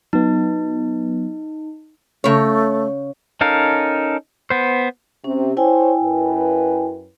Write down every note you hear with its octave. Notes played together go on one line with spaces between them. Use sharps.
F#3 B3 D#4
C#3 A3 C#5
C#4 D#4 A4 A#4 F5
B3 C5
C3 C#4
E4 C5 C#5 G5 G#5
F#2 B4